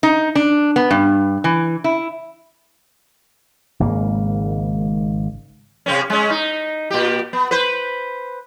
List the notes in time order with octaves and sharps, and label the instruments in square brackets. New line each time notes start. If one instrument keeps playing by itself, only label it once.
[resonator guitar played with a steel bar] D#4
D4
B3
G2
E3
E4
[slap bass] G#1 G#2 C#3 A#3
[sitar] C3 C4 C#4
G#3 C#4
D#4
A#2 G4
B3
B4 C5